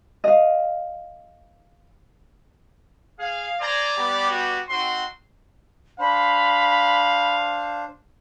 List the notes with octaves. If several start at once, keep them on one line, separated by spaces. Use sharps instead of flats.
D#5 F5
G#4 F5
C5 D5 G#5 A#5
G3 B3 G4
F#4
C4 D#4 F#4 C6
D4 C5 F5 B5